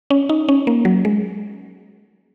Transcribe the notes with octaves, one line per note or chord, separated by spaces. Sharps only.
C#4
D#4
C#4
A#3
F#3
G#3